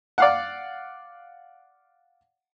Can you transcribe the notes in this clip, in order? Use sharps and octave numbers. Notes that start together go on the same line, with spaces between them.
D5 F5 F#5